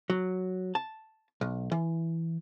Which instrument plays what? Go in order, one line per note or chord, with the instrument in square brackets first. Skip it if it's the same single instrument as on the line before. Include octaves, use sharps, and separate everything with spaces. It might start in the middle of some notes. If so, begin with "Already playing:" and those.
[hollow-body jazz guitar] F#3
A5
B1
E3